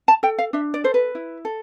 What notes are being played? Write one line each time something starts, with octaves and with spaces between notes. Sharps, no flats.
A5
A4 G5
F5
D4 E5
D5
A4 C5
B4
E4
A4